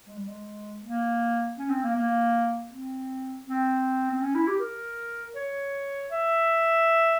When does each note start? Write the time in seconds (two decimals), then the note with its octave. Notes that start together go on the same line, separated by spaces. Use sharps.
0.07 G#3
0.17 G3
0.27 G#3
0.83 A#3
1.58 C#4
1.70 C4
1.83 A#3
1.96 A#3
2.70 C4
3.47 C4
4.11 C4
4.22 C#4
4.35 E4
4.47 G4
4.60 A#4
5.35 C#5
6.11 E5